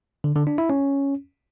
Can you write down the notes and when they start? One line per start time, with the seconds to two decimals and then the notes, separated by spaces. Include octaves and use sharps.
0.24 D3
0.36 D3
0.47 D4
0.58 E4
0.70 C#4